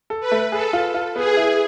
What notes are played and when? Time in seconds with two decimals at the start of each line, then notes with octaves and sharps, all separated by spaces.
0.10 A4
0.20 B4
0.32 A3
0.52 G#4 A4
0.73 F4
0.94 F4
1.15 B3 G#4
1.37 E4